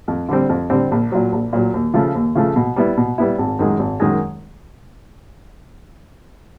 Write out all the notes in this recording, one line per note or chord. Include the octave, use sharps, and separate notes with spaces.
F2
D3 G3 C4
F2
D3 G3 C4
A#1
A#2 F#3
A#1
A#2 F#3
D#2
C#3 F3 A3
D#2
C#3 F3 A3
B2
G3 B3 E4
B2
G3 B3 E4
G#1
F#2 D#3 G#3
G#1
F#2 D#3 G#3